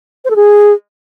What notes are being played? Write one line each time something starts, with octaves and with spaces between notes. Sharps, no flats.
C5
A4
G#4